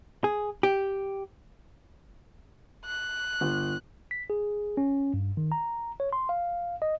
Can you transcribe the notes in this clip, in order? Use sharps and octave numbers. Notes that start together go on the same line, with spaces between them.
G#4
G4
F#6
G1
B6
G#4
C#4
G2
D#3
A#5
C#5
C6
F5
D#5